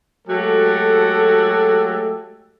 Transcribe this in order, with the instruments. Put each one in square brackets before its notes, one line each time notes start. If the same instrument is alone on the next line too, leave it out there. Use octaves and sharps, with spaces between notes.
[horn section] F#3 G#3 A3 F#4 G4 A4